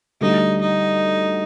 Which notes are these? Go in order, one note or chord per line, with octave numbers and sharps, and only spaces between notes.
D2 D3 G3 D#4
D#4